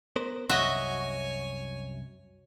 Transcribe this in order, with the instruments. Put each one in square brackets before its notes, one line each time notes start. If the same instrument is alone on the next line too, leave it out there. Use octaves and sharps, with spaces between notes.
[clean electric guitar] B3 A#4 C5
[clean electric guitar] C2 F#2 [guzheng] F#4 [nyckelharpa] C#5 G#5 [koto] D#5 E5